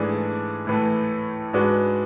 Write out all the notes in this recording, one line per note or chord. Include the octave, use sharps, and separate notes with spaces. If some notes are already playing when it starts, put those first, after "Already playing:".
Already playing: G#2 E3 A3 D4 G#4
A2 E3 A3
G#2 G#3 D4 F#4 B4